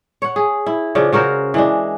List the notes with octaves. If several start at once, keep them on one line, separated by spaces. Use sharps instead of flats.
C#5 F#5
G#4
E4
C#3 F3 D4
C#3 F#4 A#4 C5
E3 G#3 D4